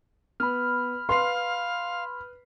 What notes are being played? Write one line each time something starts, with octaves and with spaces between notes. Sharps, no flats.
B3 B5 F6
B4 F5 C6 C7